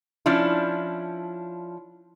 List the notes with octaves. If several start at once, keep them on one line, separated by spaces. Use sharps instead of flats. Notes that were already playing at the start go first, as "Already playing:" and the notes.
F3 C#4 D4 E4